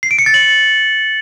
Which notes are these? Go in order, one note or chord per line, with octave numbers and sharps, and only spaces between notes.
C7
D7
C#7
A6
F#7